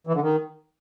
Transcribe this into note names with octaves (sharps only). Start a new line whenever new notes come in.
E3
D3
D#3